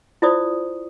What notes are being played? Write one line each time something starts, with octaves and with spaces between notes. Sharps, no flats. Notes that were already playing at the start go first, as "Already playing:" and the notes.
E4 F4 C5 D5 D#6